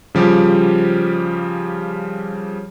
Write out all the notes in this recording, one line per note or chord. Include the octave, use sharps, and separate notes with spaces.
C#3 F3 G3 G4